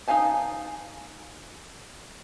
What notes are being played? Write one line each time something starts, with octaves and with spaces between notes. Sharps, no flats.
D#4 B4 F5 G#5 A5